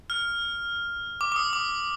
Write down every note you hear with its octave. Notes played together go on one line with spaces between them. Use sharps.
F6
D6
D6
D#6
D6